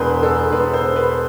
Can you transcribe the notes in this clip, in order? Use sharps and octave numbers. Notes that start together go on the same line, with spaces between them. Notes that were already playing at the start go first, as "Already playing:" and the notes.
Already playing: E1 E2 B4 C5
E2 A4
E1 B4
C5
E1
B4